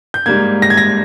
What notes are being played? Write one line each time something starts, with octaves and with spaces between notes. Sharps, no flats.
G6
G#2 G3 A#3 G#6
A#6
G#6
A#6